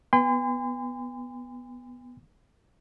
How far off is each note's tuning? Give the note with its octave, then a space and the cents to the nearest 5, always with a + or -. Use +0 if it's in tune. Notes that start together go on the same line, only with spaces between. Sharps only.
B3 +0 G#5 -45 C6 -40